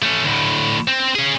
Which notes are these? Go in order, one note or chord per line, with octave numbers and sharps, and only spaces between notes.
A3 C#4
D2 A2
C4
C#4 G#4